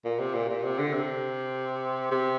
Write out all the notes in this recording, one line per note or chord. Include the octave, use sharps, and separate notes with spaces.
A#2
C3
A#2
A#2
C3
D3
C3
C3